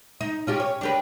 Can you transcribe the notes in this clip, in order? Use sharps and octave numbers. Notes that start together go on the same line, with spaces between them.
D#4
C#4 F4 G4
C#5
D4 G4 B4